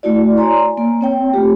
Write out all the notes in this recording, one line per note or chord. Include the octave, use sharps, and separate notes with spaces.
A3 E4 F#4 D5
C#5 D5 G#5 A#5 C6
A#3
C4 C#5 G5
A3 F4 G4